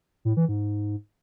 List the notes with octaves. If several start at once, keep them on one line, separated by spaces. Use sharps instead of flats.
A2
E3
G#2